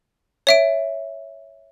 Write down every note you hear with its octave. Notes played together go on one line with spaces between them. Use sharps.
C#5 E5 D7